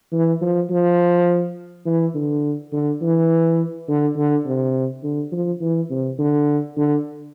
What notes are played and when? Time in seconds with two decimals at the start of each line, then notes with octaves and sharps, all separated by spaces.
0.13 E3
0.42 F3
0.71 F3
1.86 E3
2.15 D3
2.73 D3
3.01 E3
3.88 D3
4.17 D3
4.46 C3
5.03 D3
5.32 F3
5.61 E3
5.90 C3
6.19 D3
6.77 D3